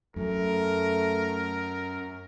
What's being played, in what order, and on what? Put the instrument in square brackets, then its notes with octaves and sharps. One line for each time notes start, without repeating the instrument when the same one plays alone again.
[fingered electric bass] F#2 [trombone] A3 [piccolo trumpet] A#4